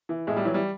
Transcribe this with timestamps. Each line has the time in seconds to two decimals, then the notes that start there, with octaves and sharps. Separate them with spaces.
0.09 E3
0.27 A2 G#3
0.36 G3
0.45 E3 F#3
0.54 G3